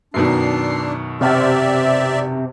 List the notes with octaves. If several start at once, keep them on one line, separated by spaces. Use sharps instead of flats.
F#2 B2 D#3 D4 C7
C3 C4 G4 D5 E5